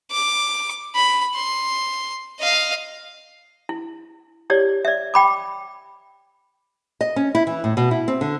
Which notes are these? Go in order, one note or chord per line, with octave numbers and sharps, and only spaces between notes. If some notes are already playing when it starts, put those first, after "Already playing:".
D6
B5
C6
D#5 F5
E4
E4 G4 C#5 D5
D5 E5
G5 B5 D6
D#5
C#4
E4
E3
A2
B2
E4
C4
D3